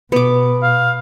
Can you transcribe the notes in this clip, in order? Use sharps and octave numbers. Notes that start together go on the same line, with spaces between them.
B2 B3 D6
F5